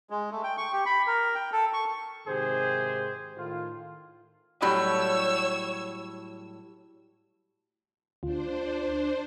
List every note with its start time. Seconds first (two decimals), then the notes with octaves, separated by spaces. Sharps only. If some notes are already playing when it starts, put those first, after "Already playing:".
0.10 G#3
0.31 A3
0.44 G5
0.58 C#6
0.73 G4
0.86 B5
1.07 A#4
1.35 G5
1.52 A4
1.73 C#6
2.27 G#2 C3 D#3 G4 G#4 C5
3.36 A2 D#3 F4
4.62 A2 F#3 G3 C#5 E6
8.23 D2 D4 F4 C5